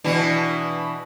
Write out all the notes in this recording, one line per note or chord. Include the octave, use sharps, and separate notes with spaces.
B2 E3 D4